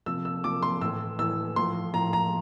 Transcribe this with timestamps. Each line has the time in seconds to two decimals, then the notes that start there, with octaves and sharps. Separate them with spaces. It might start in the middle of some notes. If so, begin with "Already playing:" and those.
0.06 C3 F3 E6
0.25 E6
0.44 C3 F3 D6
0.63 C6
0.81 A2 E3 E6
1.19 A2 E3 E6
1.56 A2 F3 C6
1.94 A2 F3 A#5
2.13 A#5